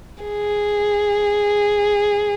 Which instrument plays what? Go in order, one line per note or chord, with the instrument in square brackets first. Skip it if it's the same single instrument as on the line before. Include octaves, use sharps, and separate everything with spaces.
[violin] G#4